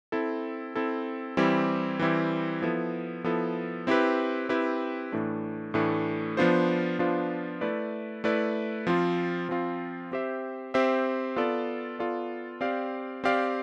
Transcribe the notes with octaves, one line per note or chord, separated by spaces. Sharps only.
C4 E4 A4
C4 E4 A4
E3 G3 C4 E4 G4
E3 G3 C4 E4 G4
F3 B3 E4 A4
F3 B3 E4 A4
C4 E4 G4 B4
C4 E4 G4 B4
A2 E3 A3 D4
A2 E3 A3 D4
F3 B3 D4 F4 C5
F3 B3 D4 F4 C5
A3 E4 B4 D5
A3 E4 B4 D5
F3 C4 F4
F3 C4 F4
C4 G4 C5 E5
C4 G4 C5 E5
B3 F4 A4 D5
B3 F4 A4 D5
C4 G4 D5 F5
C4 G4 D5 F5